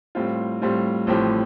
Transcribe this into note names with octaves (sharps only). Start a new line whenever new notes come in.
A2 G3 C4 F4
A2 G3 C4 F4
A1 A2 F3 C4 G4